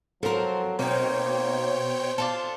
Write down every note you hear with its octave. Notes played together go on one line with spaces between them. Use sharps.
F3 F#3 C4 A4 A#4
B2 A#3 C4 D#4 C5 C#5 G5
D4 F4 A4